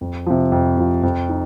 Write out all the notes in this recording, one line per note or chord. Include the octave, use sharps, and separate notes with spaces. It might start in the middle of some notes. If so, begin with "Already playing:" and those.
F2
C3 F3
F2
C3 F3
F2
D#4